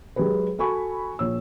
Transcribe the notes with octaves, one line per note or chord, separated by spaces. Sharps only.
F#3 G#3 G4 G#4 B4
F#4 A4 G#5 B5 C#6
A#1 C#5 E6